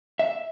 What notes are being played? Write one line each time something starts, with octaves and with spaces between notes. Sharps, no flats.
E5